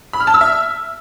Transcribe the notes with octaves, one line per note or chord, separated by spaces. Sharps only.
B5
F6
A5
E6
E5